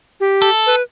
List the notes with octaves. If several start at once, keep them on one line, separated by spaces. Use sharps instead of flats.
G4
A4
B4